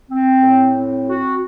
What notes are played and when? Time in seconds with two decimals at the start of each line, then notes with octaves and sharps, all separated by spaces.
0.10 C4
0.43 A2
0.76 C4
1.08 F#4